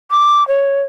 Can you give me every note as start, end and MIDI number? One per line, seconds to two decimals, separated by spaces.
0.11 0.46 86
0.48 0.82 73